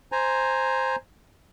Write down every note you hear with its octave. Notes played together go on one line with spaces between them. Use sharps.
C5 G#5 A#5